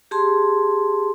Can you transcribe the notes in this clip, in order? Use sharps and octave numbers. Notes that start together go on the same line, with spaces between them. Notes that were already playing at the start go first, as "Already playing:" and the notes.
G4 G#4 A5 C6